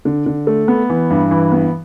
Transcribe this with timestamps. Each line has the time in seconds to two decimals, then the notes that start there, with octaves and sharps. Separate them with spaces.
0.05 D3
0.26 D3
0.47 A3
0.68 B3
0.90 E3
1.10 G2
1.31 E3
1.52 B3